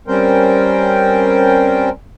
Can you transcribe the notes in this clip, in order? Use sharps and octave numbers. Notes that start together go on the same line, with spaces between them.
G3 C4 C#4 A#4 C5 G5